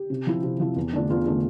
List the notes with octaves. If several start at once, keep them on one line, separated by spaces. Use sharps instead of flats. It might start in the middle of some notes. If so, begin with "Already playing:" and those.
Already playing: G4
C3
F3 C4 E4
C3
F3 C4 E4
E2
D3 A3 D4 F4
E2 F4
D3 A3 D4 F4